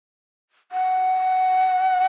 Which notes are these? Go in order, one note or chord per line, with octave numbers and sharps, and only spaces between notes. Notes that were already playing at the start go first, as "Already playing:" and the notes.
F#5